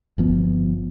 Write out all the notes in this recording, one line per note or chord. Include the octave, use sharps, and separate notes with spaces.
G1 F3 B3